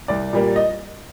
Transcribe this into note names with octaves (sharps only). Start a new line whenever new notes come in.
C2 D5
A#2 G3 A#3
D#5